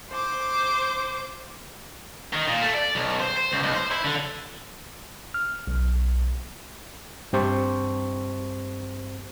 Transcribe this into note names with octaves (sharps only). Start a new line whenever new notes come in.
C5 D6
D#3
A#2
A3
D5
B1
C5
C5
C#2
B1
C5
E4
D3
F6
B1
G2 C4 G4 C5 A5 C#6